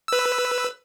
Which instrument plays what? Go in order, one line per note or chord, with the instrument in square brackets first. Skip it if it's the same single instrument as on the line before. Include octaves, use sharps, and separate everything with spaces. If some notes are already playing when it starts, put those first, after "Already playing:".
[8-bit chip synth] B4 E6